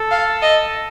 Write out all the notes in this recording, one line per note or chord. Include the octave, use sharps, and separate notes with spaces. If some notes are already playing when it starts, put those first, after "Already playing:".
Already playing: A4
F5
D#5